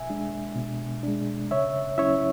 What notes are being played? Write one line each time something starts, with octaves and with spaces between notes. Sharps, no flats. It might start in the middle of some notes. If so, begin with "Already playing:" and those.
Already playing: B2 E5 G#5
G#3 D4
B2
G#3 D4
C#3 C#5 E5
F#3 C#4 E4 C#5 E5